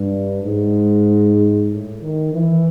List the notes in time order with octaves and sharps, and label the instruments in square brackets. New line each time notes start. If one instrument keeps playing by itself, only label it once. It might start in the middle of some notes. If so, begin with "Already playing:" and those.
Already playing: [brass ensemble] G2
G#2
A2
D#3
E3